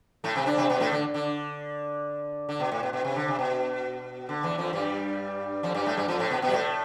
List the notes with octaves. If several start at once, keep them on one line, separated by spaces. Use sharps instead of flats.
A2 A3
C3 C4
D3 D4
C3 C4
B2 B3
A2 A3
D3
D3
D3
B2
A2
B2
B2
C3
D3
C3
B2
D3
E2 E3
F2 F3
G2 G3
F2 F3
G2 G3
A2 A3
G2 G3
F2 F3
A2 A3
B2 B3
B2 B3
G3
A2 A3